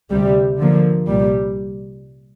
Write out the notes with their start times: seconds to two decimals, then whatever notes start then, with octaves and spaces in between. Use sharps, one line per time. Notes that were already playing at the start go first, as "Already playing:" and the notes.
0.11 D2 C3 G3
0.59 D3 F3 A#3
1.07 C2 A#2 G3